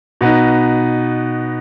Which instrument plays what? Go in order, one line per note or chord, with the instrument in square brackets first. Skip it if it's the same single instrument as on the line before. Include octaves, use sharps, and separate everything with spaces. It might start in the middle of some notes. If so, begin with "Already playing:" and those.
[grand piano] B2 B3 D#4